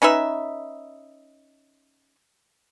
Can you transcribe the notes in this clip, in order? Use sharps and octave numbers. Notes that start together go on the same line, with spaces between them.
C#4 D#4 B4 E5